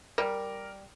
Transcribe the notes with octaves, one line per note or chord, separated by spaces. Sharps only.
G3 A#4